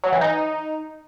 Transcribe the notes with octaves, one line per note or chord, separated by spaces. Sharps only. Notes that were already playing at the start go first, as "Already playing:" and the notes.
F#3
E3
D#4